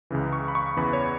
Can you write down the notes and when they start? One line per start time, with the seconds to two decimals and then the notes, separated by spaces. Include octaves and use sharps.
0.10 C#2 C#3 E3
0.33 C#6
0.48 B5
0.55 C#6
0.77 E2 C#3 E3 B5
0.93 C#5